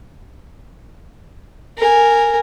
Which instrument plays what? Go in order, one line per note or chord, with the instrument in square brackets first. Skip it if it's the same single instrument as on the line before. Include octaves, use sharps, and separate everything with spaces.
[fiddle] A#4 G#5